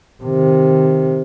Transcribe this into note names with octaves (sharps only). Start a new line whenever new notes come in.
C3 D#3